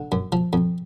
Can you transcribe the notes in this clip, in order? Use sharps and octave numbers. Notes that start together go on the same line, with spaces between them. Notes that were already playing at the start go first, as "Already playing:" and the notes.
Already playing: D3
F#2
F3
F2